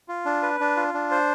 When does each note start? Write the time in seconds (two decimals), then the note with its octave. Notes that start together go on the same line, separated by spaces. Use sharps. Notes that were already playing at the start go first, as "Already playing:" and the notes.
0.08 F4
0.26 D4
0.42 B4
0.60 D4
0.76 F4
0.94 D4
1.11 C5